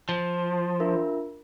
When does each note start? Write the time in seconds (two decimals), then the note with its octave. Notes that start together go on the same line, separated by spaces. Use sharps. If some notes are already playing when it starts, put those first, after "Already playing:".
0.09 F3
0.80 D4 F4 A#4 E5